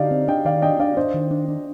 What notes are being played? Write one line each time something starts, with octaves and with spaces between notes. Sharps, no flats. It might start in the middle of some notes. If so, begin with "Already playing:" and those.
Already playing: D3 D#4 G4 D5 F5
C4
D4 D#5 G5
D#3 D5 F5
D4 D#5 G5
D4 D5 F5
D4 C5 D#5
D#3
D4
D4